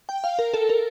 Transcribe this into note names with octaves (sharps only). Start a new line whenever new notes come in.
G5
F5
A#4
A4
A#4